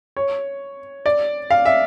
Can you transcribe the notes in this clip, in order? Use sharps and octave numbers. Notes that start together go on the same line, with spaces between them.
C#5
D5
F5
E5